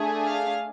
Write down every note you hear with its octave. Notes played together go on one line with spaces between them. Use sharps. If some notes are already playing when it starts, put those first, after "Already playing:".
Already playing: A3 D4 G#4
F5